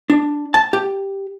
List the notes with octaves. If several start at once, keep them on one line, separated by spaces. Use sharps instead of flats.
D4
A5
G4